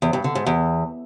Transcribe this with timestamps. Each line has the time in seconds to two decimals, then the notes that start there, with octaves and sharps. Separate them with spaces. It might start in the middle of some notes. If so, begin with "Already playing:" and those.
0.02 E2
0.13 G2
0.24 D3
0.35 G#2
0.46 E2